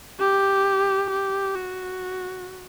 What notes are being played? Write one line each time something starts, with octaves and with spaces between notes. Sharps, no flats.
G4
G4
F#4